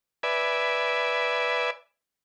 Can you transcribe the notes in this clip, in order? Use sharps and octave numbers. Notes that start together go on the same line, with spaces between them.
B4 D5 E5 G#5